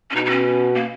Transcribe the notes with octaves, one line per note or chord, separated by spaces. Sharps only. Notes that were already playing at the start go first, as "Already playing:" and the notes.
C#4
B2 D#4
D#4
C#4
A#3